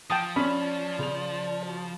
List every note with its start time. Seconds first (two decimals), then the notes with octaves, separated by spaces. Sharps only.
0.10 F3 G5 A5 D#6
0.36 C#4 D5 B5
0.99 C#3 F7
1.66 F#4